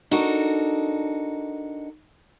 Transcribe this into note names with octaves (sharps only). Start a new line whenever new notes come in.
D4 D#4 F#4 A4 A#4